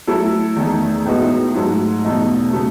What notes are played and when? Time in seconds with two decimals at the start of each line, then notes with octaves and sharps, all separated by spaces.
0.07 F#3 A3 E4 A4
0.56 E2 D#3 A3
1.06 A2 G#3 B3 D#4 F#4
1.54 G#2 F#3 A3
2.04 E2 B2 A3 D#4
2.53 C#3 F#3 A3